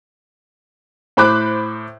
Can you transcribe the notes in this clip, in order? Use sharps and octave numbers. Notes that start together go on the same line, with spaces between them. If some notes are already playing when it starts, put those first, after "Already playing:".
A2 C5 B5 D6 F#6